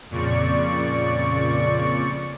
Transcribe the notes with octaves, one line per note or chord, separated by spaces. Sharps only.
F2 A#2 C#3 D5 C#6 C#7